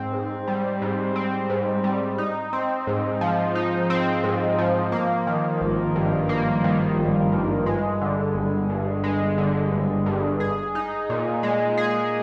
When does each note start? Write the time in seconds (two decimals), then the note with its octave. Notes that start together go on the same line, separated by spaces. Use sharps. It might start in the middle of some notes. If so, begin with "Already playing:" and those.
Already playing: G#2 C4
0.13 G#2
0.48 G3
0.82 G#2
1.16 C4
1.50 G#2
1.84 G3
2.18 D#4
2.53 C4
2.87 G#2
3.21 F3
3.55 D#4
3.90 C4
4.24 G#2
4.59 F3
4.92 A#3
5.27 D#3
5.61 G#1
5.96 G2
6.29 A#3
6.64 D#3
6.98 G#1
7.32 G2
7.66 G#3
8.01 D3
8.35 G1
8.69 G2
9.04 G#3
9.38 D3
9.72 G1
10.06 G2
10.40 G#4
10.75 D#4
11.10 A#2
11.43 G#3
11.77 G#4